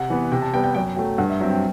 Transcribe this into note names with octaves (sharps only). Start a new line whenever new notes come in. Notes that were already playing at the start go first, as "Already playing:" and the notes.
Already playing: C3 F#5
E3 B3
C3 G5
A5
G3 B3 G5
G5
F#2 G5
F#3 A3 G5
G2 F#5
E5
F#3 C4 E5
G5